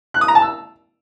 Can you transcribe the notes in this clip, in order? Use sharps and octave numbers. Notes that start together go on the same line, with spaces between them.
F#6
D#6
A#5
A5
E6